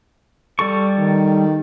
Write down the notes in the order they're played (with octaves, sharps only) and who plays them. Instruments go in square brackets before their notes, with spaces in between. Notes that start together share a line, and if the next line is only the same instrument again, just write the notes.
[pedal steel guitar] G3 A4 C#6
[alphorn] D#3